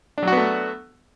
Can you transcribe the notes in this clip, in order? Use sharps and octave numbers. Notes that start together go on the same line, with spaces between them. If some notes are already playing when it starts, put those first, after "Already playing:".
F#3 A3 B3 D4 F#4